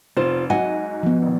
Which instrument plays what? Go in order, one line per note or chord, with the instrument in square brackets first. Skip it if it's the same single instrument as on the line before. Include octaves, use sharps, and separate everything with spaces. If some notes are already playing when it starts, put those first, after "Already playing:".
[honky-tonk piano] F1 E7 [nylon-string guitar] F4 C5
[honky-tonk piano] G#2 F#3 [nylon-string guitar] D#5 F#5 G#5
[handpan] F3 B3
[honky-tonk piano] A#1 D#3